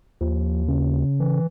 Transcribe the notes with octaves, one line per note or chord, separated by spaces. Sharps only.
D#2 F3
C#3
E3